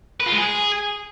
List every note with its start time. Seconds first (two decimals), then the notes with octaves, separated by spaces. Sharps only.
0.20 B4
0.26 F4
0.32 G#3
0.38 G#4